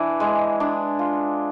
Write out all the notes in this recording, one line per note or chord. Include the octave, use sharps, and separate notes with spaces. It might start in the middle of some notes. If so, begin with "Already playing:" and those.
Already playing: E3 D4
G#3
D4
F4